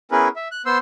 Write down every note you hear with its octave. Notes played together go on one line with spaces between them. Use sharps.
B3 C#4 E4 G#4 A#4 B4
E5
F#6
B3 C5 C6 E6